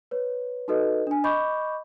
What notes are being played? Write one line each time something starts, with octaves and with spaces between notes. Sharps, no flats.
B4 C#5
D#4 F#4 A4 B4 D#5
D4 G#5
D#5 B5 C#6 D6 G6